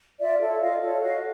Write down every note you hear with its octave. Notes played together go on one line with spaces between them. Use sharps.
F4 D5 E5
A4 C#5
F4 D#5 F5
A4 C#5
F#4 D#5 F5